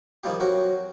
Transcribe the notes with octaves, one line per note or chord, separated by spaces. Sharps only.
D#3 F3 G3 A#3 G4
F#3 C4 F#4 A#4